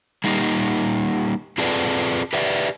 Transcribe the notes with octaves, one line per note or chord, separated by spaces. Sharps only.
G3 A#3 D#4 G4
C4 F4 G#4 A4 B4 D5
G4 B4 D5 E5